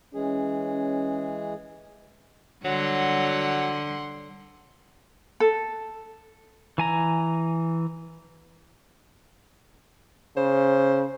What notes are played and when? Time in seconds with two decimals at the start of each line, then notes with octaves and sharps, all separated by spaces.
0.14 E3 G#3 C#4 G#4
2.65 D3 F#3 G3 F#5 C6
5.40 A4
6.78 E3 G#5 A#5
10.37 C#3 C5